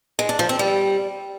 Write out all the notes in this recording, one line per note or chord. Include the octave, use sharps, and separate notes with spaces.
G#3
D4
F3
C4
G3